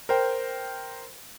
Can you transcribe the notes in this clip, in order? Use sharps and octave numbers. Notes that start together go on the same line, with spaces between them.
A#4 C5 G5